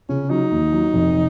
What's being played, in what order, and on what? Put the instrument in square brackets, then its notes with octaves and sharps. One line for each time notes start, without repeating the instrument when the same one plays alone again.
[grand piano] C#3 [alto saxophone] C#4
[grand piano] F#3 [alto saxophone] D#4
[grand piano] D#2
F#3
F1